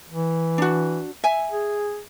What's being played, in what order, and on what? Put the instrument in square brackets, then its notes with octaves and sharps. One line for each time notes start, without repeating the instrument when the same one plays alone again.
[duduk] E3
[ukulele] D4 F#4
E5 G#5
[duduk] G#4